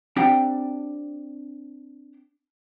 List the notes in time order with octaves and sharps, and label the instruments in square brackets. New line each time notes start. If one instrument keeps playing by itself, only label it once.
[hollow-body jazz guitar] C4 D4 G4 F#5 G5